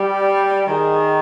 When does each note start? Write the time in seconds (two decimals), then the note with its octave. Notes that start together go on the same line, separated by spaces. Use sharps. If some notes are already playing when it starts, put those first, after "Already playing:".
Already playing: G3
0.21 D5
0.67 D#3 G#4